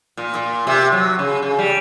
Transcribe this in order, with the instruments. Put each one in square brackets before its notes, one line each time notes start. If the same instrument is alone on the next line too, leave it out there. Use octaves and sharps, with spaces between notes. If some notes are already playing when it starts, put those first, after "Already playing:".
[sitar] A#2
A#2
C3
F#3
C#3
C#3
G3